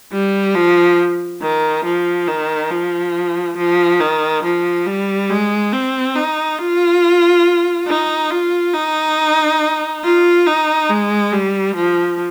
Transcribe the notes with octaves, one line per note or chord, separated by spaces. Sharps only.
G3
F3
D#3
F3
D#3
F3
F3
D#3
F3
G3
G#3
C4
D#4
F4
D#4
F4
D#4
F4
D#4
G#3
G3
F3